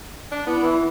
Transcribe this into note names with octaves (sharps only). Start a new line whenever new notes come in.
D4
B3 E4
E3